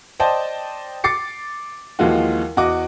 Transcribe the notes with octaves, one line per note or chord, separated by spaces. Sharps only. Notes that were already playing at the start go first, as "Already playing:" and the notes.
C5 D5 D#5 G5 A5
D6 A6 C7 C#7
D#2 E3 F3 G#3 F4 F#4
E2 F#4 D#5 D6